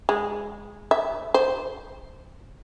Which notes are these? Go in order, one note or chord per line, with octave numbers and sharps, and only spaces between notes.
G#3
E5
C5